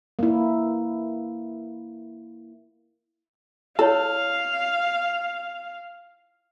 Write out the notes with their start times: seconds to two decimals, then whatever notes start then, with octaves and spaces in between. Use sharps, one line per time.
0.19 A#3 E4
3.79 E4 A4 C#5 F5